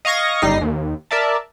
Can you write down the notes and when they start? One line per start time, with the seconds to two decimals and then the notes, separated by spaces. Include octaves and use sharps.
0.05 D#5 F5 C#6 G#6 A#6
0.42 G1 G3 D#4 A#6 C7
0.61 D#2
1.11 A#4 D5 E5 A5